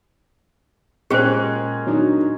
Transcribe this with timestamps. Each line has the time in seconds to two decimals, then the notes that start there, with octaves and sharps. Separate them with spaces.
1.11 A#2 G#3 C#4 G4 G#4 C5 F#6
1.87 F#3 D4 D#4